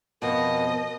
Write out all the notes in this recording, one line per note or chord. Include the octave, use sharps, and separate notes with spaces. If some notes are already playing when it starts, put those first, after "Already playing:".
F2 B2 A#4 D#5